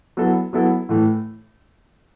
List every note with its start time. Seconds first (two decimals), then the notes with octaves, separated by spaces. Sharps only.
0.17 F#3 B3 E4 A4
0.53 F#3 B3 E4 A4
0.89 A2 E3 A3